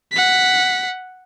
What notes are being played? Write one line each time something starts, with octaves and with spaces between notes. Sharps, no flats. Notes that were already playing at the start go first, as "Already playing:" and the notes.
F#5 B6